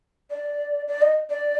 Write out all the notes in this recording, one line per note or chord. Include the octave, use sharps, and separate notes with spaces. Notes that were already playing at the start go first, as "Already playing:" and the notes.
D5
D5
D#5
D5